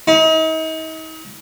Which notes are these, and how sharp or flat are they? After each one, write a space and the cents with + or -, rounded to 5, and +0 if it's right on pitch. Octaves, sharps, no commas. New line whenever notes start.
D#4 +40